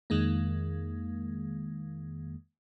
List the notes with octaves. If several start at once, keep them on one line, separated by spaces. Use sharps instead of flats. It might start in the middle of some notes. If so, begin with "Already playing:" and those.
F2 D#3 G#3 A#3